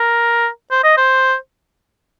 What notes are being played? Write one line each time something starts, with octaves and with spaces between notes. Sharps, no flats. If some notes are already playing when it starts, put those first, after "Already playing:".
Already playing: A#4
C5
D#5
C5